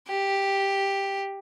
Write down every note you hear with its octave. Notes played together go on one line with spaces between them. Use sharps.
G4